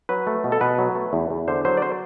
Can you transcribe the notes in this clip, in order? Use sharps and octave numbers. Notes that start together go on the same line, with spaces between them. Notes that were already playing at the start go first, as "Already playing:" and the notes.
F#3 B4
A3
B2
A4
B2 B4
F#3
A3
E2
E2
D3 C5
F#3 C5
D5
C5